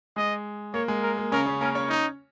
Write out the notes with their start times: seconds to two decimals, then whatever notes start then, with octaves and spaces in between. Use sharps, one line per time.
0.16 G#3 D#5
0.74 A#3 C#5
0.88 G#3
1.03 A#4
1.18 A#3
1.32 C#3 C#4 A#4
1.46 C#3 C#4
1.61 A#3 C#4 A#4
1.75 C#4 C#5
1.89 D#4